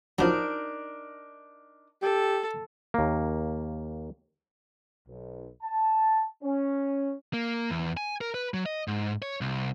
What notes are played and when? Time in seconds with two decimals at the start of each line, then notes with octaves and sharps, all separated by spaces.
0.19 F3 F#3 D4 D#4 A#4
2.02 G4 A4
2.94 D#2 A#3
5.08 B1
5.62 A5
6.43 C#4
7.33 A#3
7.70 E2
7.97 G#5
8.21 A#4
8.34 B4
8.54 F#3
8.66 D#5
8.88 G#2
9.22 C#5
9.41 C2